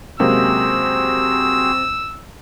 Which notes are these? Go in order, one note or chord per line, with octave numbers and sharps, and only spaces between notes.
F#2 C3 G#3 A#3 C4 F#4 G#4 E6